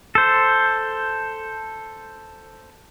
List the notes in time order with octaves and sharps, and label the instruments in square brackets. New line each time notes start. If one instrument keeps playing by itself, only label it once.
[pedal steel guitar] A4 C5